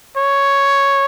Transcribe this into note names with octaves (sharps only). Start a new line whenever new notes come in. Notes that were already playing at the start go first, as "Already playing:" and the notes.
C#5